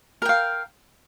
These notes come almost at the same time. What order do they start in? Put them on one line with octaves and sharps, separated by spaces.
A#4 G5 F5